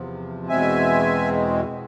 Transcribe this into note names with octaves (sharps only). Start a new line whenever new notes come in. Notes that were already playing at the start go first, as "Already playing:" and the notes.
Already playing: E2 C3 F3
E2 B2 G#3 C4 E5 G#5